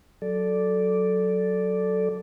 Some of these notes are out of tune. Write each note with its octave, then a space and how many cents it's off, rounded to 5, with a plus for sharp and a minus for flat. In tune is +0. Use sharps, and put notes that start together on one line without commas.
F#3 +0 A4 +0 D5 -5